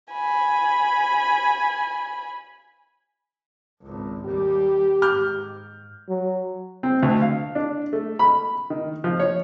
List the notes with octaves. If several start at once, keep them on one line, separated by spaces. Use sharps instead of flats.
G#5 B5
G#1 C#2
D#2 G3 G4
G#2 D6 F6 G6
F#3
C4
D2
F5
D4
A3
B5
D#3
F3
C#5